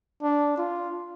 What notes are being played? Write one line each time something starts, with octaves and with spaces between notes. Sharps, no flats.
D4
F4